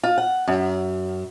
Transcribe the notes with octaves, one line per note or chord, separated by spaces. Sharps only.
F4
F#5
F#2